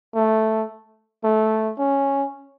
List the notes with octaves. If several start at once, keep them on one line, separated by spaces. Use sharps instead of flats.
A3
A3
C#4